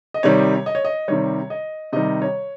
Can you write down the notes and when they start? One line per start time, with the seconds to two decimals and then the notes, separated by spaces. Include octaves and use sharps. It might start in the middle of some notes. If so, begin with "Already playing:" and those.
0.14 D#5
0.23 C3 D#3 G3 C#5
0.66 D#5
0.75 C#5
0.85 D#5
1.08 C3 D#3 G3 C#5
1.50 D#5
1.93 C3 D#3 G3 D#5
2.22 C#5